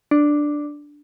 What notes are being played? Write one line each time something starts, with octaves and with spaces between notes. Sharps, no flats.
D4